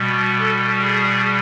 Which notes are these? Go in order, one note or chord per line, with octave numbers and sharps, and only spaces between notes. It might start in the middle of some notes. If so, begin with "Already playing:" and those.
Already playing: B2 G3
A4
G#4